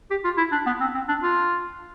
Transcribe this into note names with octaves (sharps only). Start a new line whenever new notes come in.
G4
F4
E4
D4
B3
C4
C4
D4
F4